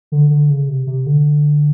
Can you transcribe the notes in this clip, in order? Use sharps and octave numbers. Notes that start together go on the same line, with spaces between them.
D3
D3
C#3
C3
C3
D3